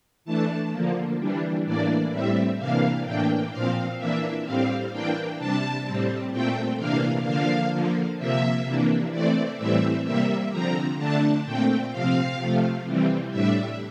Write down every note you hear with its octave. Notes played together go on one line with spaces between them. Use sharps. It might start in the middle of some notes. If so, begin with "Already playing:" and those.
E3 A3 D4 A5
D3 F3 A#3
E3 G3 D4
A2 E3 A#3 D4 D5
A2 G3 C4 E5
C3 E3 A#3 D4 F5
A2 E3 A#3 D4 G5
A#2 F3 C4 F5
E3 A#3 D4 E5
A2 G3 C4 F5
E3 A#3 D4 G5
C3 G3 D4 A5
A2 G3 C4
A#2 A3 C4 G5
C3 E3 A#3 D4 F5
D3 F3 A#3 D4 F5
D3 F3 A#3
C3 F3 A#3 E5
C3 E3 A#3 D4
E3 A3 C4 D5
A2 E3 G3 C4 E5
C3 G3 A#3 E5
D3 F3 C4 A#5
D3 A3 D4 A5
A#2 A3 C4 G5
C3 F3 C4 F5
C3 F3 A3
C3 E3 G3 C4
A2 G3 D4 E5